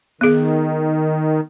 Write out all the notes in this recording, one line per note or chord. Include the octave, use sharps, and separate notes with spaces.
D#3 B3 G#4